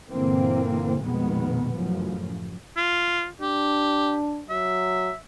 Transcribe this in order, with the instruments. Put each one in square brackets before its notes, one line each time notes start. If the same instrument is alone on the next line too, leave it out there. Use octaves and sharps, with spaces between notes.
[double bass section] G1 A#2 D3 E3 A#3 C4
F1 A#1 B2 D#3 G#3 B3
A1 F#2 A2 C#3 F3
[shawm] F4
[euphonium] D4 [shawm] G4
[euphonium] F#3 [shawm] E5